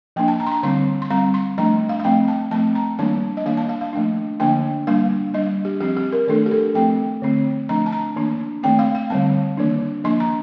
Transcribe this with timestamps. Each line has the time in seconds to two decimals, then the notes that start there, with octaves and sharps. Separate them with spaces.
0.16 F3 A#3 D4 G5
0.28 A5
0.40 A#5
0.47 C6
0.52 A#5
0.63 D3 G3 C4 C6
1.02 C6
1.10 G3 C4 A#5
1.34 C6
1.58 F3 A3 D4 A#5
1.89 F5
2.00 F5
2.04 F3 A3 C4 G5
2.28 A5
2.51 F3 A3 C4 A5
2.75 A#5
2.99 D#3 G3 A#3 D4 A5
3.37 D#5
3.46 D#3 A#3 D4 F5
3.57 A5
3.69 F5
3.81 F5
3.93 F3 A3 D4
4.40 D3 F3 A#3 D4 G5
4.87 G3 A#3 D4 F5
5.34 G3 D4 D#5
5.65 G4
5.80 F3 C4 G4
5.97 G4
6.12 A#4
6.27 D#3 A3 D4 A4
6.46 G4
6.51 A4
6.75 F3 A3 C4 G5
7.22 D3 A3 C4
7.69 F3 A3 D4 A#5
7.86 A5
7.93 A#5
8.16 D#3 A#3 D4
8.63 D#3 A3 C4 G5
8.79 F5
8.95 F5
9.10 D3 G3 C4 A5
9.57 D#3 A#3 D4
10.04 F3 A#3 D4 C6
10.20 A#5